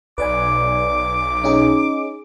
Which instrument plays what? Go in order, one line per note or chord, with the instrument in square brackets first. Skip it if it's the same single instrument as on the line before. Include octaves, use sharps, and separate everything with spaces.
[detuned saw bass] B1 [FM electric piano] B4 D5 G#5 [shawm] D6
[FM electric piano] C#4 D#4 G#4